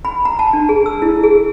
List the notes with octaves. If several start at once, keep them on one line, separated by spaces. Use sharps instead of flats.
B5
A#5
A5
D4
G#4
E6
E4
G#4